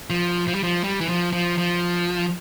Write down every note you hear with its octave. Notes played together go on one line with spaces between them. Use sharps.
F3
F3
G3
F3
G3
E3
F3
F3
F3